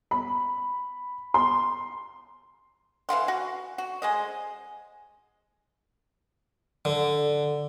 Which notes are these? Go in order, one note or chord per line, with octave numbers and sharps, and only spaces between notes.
B5
C6
E3 F5 F#5 C6
F#4
F#4
G#3 C5 D#5
D3